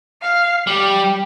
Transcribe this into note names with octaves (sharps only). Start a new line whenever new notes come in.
F5
G3 G4